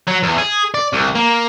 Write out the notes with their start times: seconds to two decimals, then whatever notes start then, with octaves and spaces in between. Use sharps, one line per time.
0.08 F#3
0.23 E2
0.38 G#4
0.74 D5
0.93 C2
1.16 A#3